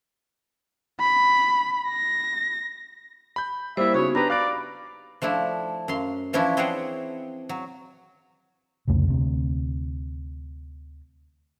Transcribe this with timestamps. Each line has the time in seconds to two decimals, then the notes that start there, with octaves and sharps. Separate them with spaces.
1.00 B5
1.89 A#6
3.36 B5 G6
3.77 G3 A#3 E4 C5 E5
3.94 C#3 B3 D#4 F#4 C#5
4.15 D4 G4 B4 A#5 B5
4.30 D5 F5 F#6 D7
5.22 F3 A3 D4 E4
5.88 F#2 F5 C6
6.33 E3 F3 C#4 D4 E4
6.57 C4 G#4 C5 C#5 F#5 G5
7.49 F#3
8.88 C2 F2 C#3 A3
9.08 D2 C3